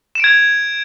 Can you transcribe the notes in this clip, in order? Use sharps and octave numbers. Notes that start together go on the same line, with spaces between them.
G#6 D7 E7